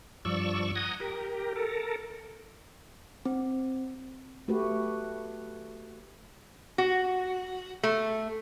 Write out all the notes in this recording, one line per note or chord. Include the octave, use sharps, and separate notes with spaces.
G2 F3 D5 C#6 E6
F#5 G#5 A#5 D#6
G4 A#4
A4 A#4
C4
A3 F#4 G4 B4
F#4
A3